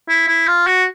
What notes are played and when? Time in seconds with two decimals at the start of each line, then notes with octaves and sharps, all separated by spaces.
0.09 E4
0.28 E4
0.47 F4
0.67 F#4